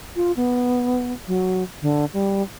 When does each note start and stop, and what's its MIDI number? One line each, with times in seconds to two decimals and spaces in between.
0.16 0.32 65
0.37 1.13 59
1.27 1.63 54
1.82 2.05 50
2.13 2.42 55